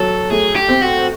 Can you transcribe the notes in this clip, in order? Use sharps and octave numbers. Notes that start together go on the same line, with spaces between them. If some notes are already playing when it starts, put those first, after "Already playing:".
Already playing: F#3 A4
A3 G#4
G4
C4
F#4